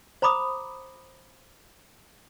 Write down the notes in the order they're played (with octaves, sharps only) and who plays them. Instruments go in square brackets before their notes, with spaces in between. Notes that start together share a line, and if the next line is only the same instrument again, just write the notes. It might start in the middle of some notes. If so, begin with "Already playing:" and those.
[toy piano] C5 A#5 B5 D6 D#6